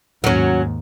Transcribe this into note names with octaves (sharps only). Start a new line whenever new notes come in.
D#2 G#2 F#3 C#4